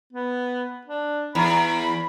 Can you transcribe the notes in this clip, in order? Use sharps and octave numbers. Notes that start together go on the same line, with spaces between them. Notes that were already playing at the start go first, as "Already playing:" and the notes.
B3
D4
E2 B5